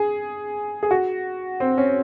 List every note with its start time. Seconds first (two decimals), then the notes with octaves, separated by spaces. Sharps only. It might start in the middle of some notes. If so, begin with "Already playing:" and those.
Already playing: G#4
0.83 G#4
0.91 F#4
1.60 C4
1.78 C#4